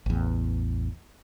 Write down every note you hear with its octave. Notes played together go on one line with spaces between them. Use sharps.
A1 E2